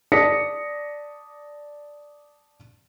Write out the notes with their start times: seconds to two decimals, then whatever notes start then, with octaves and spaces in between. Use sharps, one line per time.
0.12 D5 A5 D#6 A#6 B6 C#7